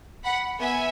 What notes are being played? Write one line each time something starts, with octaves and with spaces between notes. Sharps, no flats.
F#5 B5
B3 E5 G#5